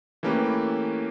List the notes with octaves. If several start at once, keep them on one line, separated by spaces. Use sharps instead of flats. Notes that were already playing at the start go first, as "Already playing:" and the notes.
E3 A3 A#3 C#4 G4 B4